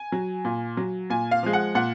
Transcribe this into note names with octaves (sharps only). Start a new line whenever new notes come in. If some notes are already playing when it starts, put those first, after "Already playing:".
Already playing: G#5
F#3
A#2
F#3
A#2 G#5
F5
F3 G#3
F#5
A#2 F#5